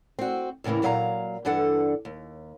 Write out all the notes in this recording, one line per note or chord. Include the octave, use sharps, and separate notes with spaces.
C4 F#4
E2 A2 C#3 E3 A#3
A#2 F#3 B4 D#5 F5 A#5
G2 E3 D4 A4 F#5
D#2